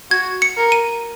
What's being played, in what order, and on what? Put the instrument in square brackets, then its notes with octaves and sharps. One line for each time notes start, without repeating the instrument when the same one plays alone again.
[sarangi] F#4 [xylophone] G#6
[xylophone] C#7
[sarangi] A#4
[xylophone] D#7